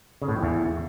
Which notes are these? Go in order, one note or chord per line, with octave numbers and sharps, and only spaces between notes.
C#3
A2
F2
E2